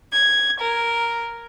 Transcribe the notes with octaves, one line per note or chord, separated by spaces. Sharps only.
G#6
A#4